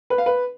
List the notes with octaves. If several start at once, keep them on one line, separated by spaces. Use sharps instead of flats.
B4
F5
B4